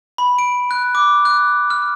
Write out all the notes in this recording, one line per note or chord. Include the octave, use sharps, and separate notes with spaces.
B5
D7
F#6
D6
F#6
F6